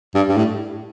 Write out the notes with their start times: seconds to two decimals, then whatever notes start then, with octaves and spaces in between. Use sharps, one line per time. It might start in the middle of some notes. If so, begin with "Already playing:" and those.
0.15 G2
0.29 G2
0.37 A2